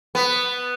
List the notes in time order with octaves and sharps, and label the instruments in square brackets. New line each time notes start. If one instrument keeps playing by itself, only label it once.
[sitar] B3